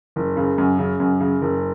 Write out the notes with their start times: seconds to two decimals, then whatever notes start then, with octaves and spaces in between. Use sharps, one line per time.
0.16 F#1
0.37 C#3
0.58 F#2
0.79 C#3
1.00 F#2
1.20 C#3
1.42 F#1